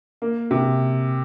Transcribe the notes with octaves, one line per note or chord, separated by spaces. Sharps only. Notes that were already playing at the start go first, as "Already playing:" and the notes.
A#3
C3